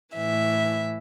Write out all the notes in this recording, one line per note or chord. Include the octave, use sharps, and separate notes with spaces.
A2 E3 E5